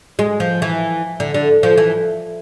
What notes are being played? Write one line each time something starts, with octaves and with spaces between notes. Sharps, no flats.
G#3
F3
E3
D3
D3
F3
E3